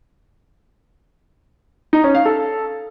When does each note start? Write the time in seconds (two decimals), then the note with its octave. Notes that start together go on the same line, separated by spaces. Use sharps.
1.93 D#4
2.04 C#4
2.15 F5
2.26 A4